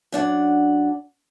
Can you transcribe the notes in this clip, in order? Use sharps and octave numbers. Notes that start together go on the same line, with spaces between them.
F#2 D4 F#5